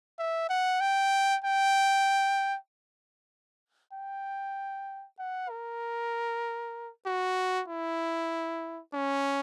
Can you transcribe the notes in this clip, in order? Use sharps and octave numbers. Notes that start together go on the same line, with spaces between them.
E5
F#5
G5
G5
G5
F#5
A#4
F#4
E4
C#4